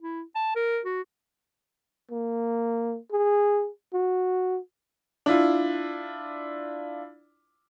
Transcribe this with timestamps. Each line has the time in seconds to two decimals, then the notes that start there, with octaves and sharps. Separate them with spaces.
0.01 E4
0.35 A5
0.55 A#4
0.85 F#4
2.11 A#3
3.12 G#4
3.93 F#4
5.26 D4 E4 F4